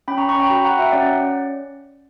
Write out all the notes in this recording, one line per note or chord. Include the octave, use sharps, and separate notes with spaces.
C#4 G5 B5
A#5 C#6
C#4 A#5 C#6
G5 B5
F#4 A#5 C#6
F#5 A#5
F#4
E5 G5
C#4 D5 F#5
C#4